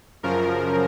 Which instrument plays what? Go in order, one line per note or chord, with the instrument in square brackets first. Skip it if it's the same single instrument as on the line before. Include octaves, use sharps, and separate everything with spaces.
[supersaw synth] F#2 C#3 F3 A#4